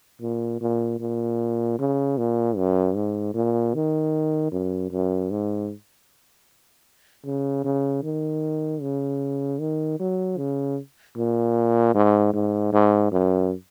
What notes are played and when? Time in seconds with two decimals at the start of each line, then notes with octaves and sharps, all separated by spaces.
0.22 A#2
0.61 A#2
1.00 A#2
1.79 C#3
2.18 A#2
2.57 F#2
2.96 G#2
3.34 A#2
3.74 D#3
4.52 F#2
4.91 F#2
5.31 G#2
7.25 C#3
7.65 C#3
8.03 D#3
8.81 C#3
9.60 D#3
10.00 F#3
10.38 C#3
11.16 A#2
11.94 G#2
12.34 G#2
12.73 G#2
13.12 F#2